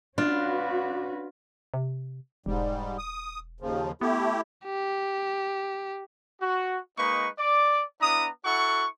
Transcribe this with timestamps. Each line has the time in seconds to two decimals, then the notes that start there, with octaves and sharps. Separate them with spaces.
0.18 C#4 D4 F4 F#4 B4
1.74 C3
2.46 E1 G#2 G3
2.98 D#6
3.60 D#2 C#3 F3
4.01 A3 B3 E4 G4
4.65 G4
6.42 F#4
6.98 G#3 A#3 D#4 B4 D#5 C#6
7.39 D5 D6
8.01 B3 D4 E4 A#5 D#6
8.45 E4 F#4 A4 F#5 C#6